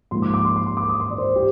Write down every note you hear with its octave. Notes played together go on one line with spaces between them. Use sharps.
G#2 F3 A#3 C6
D6
D6
C6
C6
C6
D6
D#6
C6
D5
C5
G4